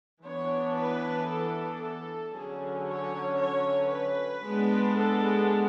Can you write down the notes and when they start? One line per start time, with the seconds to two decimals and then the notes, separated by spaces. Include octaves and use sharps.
0.24 E3 B3 D4 C#5
0.77 B4
1.30 A4
1.83 A4
2.35 D3 F#3 C#4 G#4
2.89 C#5
3.41 C#5
3.93 B4
4.46 G#3 B3 D4
4.99 A4